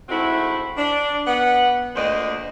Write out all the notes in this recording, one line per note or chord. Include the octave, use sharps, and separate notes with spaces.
G#2 A3 C4 E4 F#4
D4
B3 F#5
D2 A#2 C5 D5 D#5